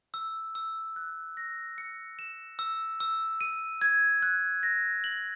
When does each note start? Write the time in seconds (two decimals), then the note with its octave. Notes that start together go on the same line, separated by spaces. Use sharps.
0.14 E6
0.55 E6
0.96 F#6
1.37 A#6
1.78 C#7
2.19 E7
2.59 E6
3.00 E6
3.41 D#7
3.82 G#6
4.22 F#6
4.63 A#6
5.04 F#7